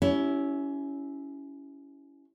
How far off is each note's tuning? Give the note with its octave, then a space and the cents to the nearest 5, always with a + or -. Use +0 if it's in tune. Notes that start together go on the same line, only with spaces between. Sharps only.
C#4 +20 E4 -5 G4 -20